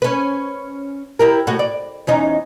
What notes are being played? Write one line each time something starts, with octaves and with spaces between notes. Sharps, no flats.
C#4 B4
E4 G4 A#4
A2 F#4
D5
E2 C#4 D#4